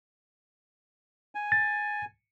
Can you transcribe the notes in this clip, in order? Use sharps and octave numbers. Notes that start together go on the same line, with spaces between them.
G#5
A6